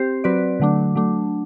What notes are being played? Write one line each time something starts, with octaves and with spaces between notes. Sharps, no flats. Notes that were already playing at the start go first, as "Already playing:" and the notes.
Already playing: C4 G4 C5
F#3 C4 F#4 B4 D5
D3 F#3 A3 D4
F#3 A3 D4